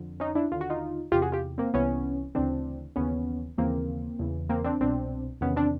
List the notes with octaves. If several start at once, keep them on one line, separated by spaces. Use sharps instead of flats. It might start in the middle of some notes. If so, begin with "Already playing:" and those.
Already playing: F2 D3
C#4 D#4
D4 E4
D#2 D3 F4
F#4
D#4 F4
E2 C3 E3 F4 G4
F#4 G#4
F4 G4
A#3 C4
C2 C3 E3 B3 C#4
D2 C#3 E3 C4 D4
D#2 C#3 E3 B3 C#4
D#2 C#3 E3 A#3 C4
E2 C#3 E3
A#3 C4
C4 D4
C2 B2 C4 D4
E2 C3 D#3 B3 C#4
C4 D4